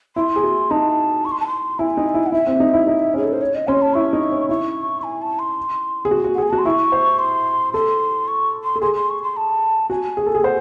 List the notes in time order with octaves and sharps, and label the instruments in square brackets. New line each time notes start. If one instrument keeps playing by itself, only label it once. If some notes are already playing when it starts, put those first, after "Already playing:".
[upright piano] E4 [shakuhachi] C6
[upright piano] G#4
F#4
[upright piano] D#4 [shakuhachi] A5
[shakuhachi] C#6
C6
A5
C6
[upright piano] E4 [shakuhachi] G#5
[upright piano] D#4
E4
[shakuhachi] F#5
[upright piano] E4 [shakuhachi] E5
[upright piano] C4
D#4
E4
D#4
C#4
[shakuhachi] G#4
A4
C5
C#5
D#5
[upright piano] C#4 [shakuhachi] C6
[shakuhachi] A5
[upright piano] E4 [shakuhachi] C#6
[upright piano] D#4
C#4
[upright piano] E4 [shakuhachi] C#6
[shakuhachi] G#5
A5
C6
[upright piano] G#4
F#4
F#4
[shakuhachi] F#5
[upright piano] G#4
[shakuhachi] G#5
[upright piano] F#4 [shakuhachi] A5
[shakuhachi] C6
[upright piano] E4 [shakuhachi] C#6
[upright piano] C5
[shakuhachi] C6
[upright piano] A4 [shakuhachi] C6
[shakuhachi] C#6
C6
[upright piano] A4
[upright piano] G#4 [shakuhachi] C6
[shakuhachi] C6
C#6
C6
A5
[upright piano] F#4 [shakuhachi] G#5
[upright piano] G#4
A4
G#4
[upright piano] C5 [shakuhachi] F#5